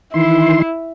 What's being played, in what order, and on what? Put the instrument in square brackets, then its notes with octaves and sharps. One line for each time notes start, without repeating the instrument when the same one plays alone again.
[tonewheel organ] D#3 E3 C6 [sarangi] E4